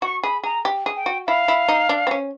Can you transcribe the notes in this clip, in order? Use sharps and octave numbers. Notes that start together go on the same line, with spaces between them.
F#4 C#6
G#4 B5
G#4 A#5
G4
G#4
G5
F#4
E4 F5
E4
D#4
D4
C4
C#4